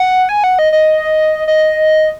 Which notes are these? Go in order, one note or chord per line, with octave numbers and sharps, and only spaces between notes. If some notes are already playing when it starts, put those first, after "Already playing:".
Already playing: F#5
G#5
F#5
D#5
D#5
D#5